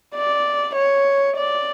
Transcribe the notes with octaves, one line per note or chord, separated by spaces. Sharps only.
D5
C#5
D5